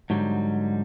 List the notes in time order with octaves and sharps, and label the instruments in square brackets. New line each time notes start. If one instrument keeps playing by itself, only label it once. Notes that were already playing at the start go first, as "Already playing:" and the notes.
[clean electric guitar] G#2 D3 F#3 G3